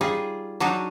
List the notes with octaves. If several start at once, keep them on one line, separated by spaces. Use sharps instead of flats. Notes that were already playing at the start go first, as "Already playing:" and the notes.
G3 D#4 F4 G#4
F#3 D4 D#4